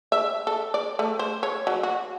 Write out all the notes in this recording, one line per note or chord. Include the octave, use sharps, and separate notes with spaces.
E5
A4
D5
A3
C5
C#5
F#3
F#4